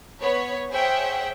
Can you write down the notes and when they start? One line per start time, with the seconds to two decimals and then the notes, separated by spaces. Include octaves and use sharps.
0.21 B3 C#5 B5
0.69 G#4 C5 C#5 E5 F#5 G5